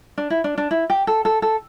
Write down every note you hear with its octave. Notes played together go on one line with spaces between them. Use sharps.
D4
E4
D4
D4
E4
G4
A4
A4
A4